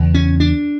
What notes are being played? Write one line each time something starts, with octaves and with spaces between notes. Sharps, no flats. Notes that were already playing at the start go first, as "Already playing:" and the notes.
Already playing: E2 C#3
C#4
D4